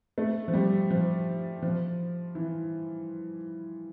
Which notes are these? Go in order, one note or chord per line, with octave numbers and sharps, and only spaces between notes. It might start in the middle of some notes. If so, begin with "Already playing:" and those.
A3
F3
G3
F3
F3
E3